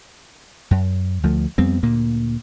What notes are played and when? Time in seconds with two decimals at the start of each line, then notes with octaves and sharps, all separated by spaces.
0.71 F#2
1.23 D2 F3 A3
1.58 F2 G3 B3 C4
1.83 D2 A#2 A#3